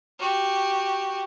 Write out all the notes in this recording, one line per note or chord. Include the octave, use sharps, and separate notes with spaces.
F#4 G4